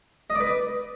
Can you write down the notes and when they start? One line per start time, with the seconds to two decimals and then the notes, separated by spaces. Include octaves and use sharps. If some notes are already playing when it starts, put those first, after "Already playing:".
0.30 D#5
0.35 D5
0.40 B4